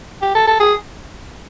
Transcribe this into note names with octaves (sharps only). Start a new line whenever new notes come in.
G4
A4
A4
G#4